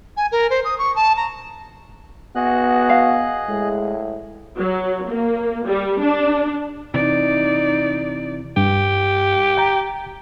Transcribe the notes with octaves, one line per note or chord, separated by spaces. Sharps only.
G#5
A#4
C5
D#6
C#6
A5
A#5
B3 F#4 G#4 D#5 F#6
F5
A2 G#3
F#3
A#3
G3
D4
C3 E3 D#4 D5
G2 G4
G5 A#5